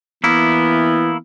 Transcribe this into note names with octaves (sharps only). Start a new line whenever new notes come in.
E3 A#3 B3 E4